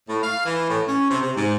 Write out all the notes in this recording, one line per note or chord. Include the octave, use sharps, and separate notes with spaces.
A2
F5
E3
A2
C#4
C3
C3
G#2